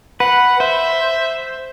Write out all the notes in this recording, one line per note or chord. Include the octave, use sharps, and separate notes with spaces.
B4 F#5
C5 E5